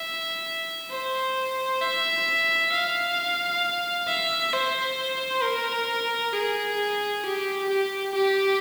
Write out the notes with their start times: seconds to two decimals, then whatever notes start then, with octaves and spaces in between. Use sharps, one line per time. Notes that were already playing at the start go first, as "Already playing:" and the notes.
Already playing: E5
0.91 C5
1.81 E5
2.73 F5
4.08 E5
4.53 C5
5.43 A#4
6.33 G#4
7.24 G4
7.69 G4
8.14 G4